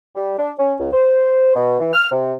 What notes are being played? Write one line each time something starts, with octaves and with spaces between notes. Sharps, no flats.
G3
D4
C#4
C#2
C5
B2
E3
F6
C3